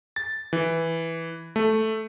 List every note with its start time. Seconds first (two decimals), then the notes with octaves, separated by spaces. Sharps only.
0.16 A6
0.53 E3
1.56 A3